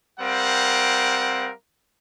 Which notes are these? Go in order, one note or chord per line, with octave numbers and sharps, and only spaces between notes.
G3 C4 A#4 F5 F#5